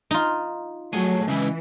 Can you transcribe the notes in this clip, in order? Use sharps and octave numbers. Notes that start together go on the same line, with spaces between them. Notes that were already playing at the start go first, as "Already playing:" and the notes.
D#4 F4
F#3 A3 G#4 G#5
C#3 E3 G#3 E4